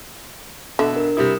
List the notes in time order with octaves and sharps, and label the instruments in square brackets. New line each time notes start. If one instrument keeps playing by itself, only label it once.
[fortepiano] B2 E5 [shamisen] D3
[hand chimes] D4 A#4
[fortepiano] C3 G3 E4 [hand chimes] D#6